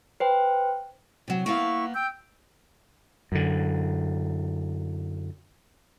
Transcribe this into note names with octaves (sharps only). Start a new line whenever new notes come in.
B4 C5 G5
C3 F#3
A#3 B3 E4 F5 C#6
G5 E6 G6
F#2 D3